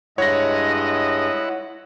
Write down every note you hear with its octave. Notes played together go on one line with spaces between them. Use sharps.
G2 G#3 E4 C#5 D#5 F#5 A#6